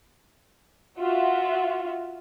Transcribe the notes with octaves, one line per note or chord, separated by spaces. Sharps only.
F4 F#4 E5